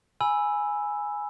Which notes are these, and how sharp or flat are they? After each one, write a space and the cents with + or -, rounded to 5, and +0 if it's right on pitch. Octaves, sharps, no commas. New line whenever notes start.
G#5 +0 B5 -10 E6 +0